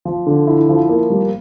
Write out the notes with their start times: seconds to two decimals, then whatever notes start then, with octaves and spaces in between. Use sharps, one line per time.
0.05 F3
0.27 D3
0.47 E4
0.69 F3
0.89 A#3
1.10 G3